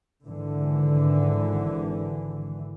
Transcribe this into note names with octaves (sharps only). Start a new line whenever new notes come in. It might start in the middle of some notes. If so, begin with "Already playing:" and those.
G#1 D3 E3